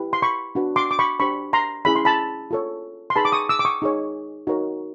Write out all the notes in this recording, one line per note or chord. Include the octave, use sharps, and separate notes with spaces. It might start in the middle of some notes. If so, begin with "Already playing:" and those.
Already playing: E4 G4 B4
C6
B5 C#6
D4 F#4 B4
C6 D6
D6
B5 C#6
D4 G4 C5 B5 C#6
A#5 C6
C#4 E4 G#4 C#5 B5
C6
A5 B5
F4 A4 C#5
C6
D#4 G#4 B4 A5 B5
D6
C#6 D#6
D6 E6
D6
C#6 D#6
D#4 G#4 C#5
D#4 F#4 A#4 C#5